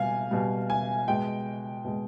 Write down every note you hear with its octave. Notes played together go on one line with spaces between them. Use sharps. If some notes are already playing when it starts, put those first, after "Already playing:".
Already playing: B2 G3 F5 G#5
B2 G3
G#5
B2 G#3 G5
B2 G#3